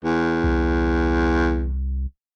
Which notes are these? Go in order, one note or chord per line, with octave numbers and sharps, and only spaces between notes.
E2
C2